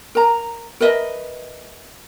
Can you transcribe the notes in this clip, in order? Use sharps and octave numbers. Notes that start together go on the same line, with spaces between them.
A#4 A#5
A#4 B4 D#5 E5